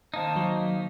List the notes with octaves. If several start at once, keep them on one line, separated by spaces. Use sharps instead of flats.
D#3 A#3 D#4 C5 F5 A5
F#3
E5